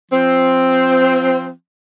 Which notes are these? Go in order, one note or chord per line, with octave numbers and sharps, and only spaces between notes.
F3 C4